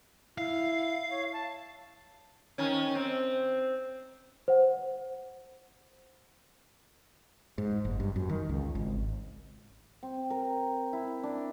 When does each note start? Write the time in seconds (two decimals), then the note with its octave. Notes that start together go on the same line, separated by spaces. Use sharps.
0.38 E4 F5
1.11 C#5
1.34 A5
2.58 D#3 C#4
2.95 C4
4.48 C5 F#5
7.58 G#2
7.85 F#1
8.00 G2
8.16 F#2
8.29 D#3
8.49 C#2
8.75 G#1
10.03 C4
10.30 A#4
10.93 E4
11.23 D4